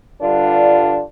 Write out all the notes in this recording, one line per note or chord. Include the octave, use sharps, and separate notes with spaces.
G2 D3 G3 D4 F4